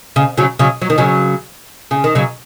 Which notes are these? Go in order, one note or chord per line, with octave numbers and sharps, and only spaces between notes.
C#3
C#3 F#3
C#3 F#3
F#3
D#3
C#3 F#3
C#3
D#3
C#3 F#3